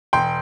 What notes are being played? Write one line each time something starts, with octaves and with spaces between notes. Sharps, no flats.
E1 G5 C6